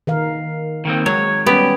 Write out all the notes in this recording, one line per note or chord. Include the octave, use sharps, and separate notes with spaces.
D#3 A#4 F5
D#3 A#3 C4
F#3 G#3 C#5
G3 B3 C#4 G4